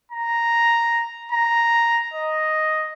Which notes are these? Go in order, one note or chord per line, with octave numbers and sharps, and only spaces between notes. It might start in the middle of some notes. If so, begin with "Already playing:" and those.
A#5
A#5
D#5